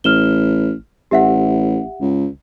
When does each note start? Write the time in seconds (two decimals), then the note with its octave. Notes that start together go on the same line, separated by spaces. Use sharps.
0.04 A1 F6 E7 G7
1.11 A1 G4 E5 F#5
2.01 C#2